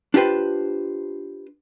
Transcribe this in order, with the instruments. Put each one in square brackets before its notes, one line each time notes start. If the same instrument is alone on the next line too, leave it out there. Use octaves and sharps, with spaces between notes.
[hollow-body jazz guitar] D4 F4 G4 B4 C5